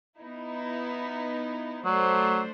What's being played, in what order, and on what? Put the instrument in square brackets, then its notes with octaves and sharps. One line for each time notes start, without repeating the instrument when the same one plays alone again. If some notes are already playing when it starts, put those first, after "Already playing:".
[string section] B3 D#4 E4
[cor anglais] F#3 [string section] A3 D4 C5